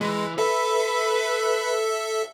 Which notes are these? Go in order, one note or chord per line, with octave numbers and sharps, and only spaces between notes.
E3 G#3
A4 B4 E5